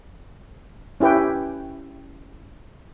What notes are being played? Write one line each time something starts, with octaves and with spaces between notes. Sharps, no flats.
C#4 E4 G4 B4 G5